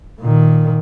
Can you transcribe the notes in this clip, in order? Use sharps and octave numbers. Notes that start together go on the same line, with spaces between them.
A#2 D#3